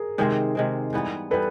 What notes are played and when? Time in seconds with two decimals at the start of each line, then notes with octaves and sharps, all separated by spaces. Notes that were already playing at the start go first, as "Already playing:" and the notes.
Already playing: G#4 A#4
0.18 C3 D#3 G#3 C4
0.55 C3 D#3 G#3 C4
0.93 G#2 E3 G3 B3
1.31 E3 G3 B3 A4 B4